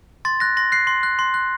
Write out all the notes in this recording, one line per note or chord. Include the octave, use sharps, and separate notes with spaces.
C6 A6
F#6 A#6
C6 A#6
F#6 C7
C6
F#6
C6
F#6